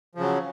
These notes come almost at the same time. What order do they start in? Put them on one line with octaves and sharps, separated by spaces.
F3 C#3 F#3